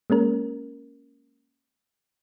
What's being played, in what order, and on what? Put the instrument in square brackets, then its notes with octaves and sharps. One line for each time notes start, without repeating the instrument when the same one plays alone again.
[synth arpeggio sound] G#3 A#3 C#4 A#4